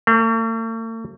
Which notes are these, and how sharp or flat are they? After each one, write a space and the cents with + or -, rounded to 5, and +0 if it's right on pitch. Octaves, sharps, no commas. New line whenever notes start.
A3 +45